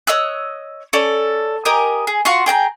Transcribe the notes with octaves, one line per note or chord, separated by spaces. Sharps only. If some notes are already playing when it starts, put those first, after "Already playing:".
C#5 D#5 E6 F#6
C#4 A4 D5
G4 A#4 D#5 G#5
G#4
F4 F#4 C6 C#6
G#4 G5 A5 A#5